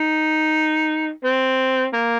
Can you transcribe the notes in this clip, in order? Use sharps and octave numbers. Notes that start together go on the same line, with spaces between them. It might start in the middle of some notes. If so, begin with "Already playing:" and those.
Already playing: D#4
C4
A#3